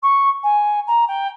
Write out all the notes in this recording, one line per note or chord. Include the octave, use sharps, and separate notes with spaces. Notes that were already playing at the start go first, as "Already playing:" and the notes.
C#6
G#5
A#5
G5